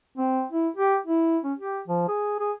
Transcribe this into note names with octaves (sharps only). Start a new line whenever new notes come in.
C4
E4
G4
E4
C#4
G4
F3
G#4
G#4